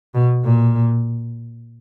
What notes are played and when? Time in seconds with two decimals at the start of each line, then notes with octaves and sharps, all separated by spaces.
0.15 B2
0.44 A#2